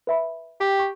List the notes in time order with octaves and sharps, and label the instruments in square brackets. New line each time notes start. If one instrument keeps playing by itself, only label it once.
[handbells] B4 E5 B5
[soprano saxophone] G4 [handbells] G5
[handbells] C#6